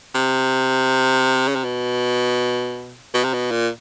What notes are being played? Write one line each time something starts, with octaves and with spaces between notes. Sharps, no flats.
C3
C#3
C3
B2
B2
C3
B2
A#2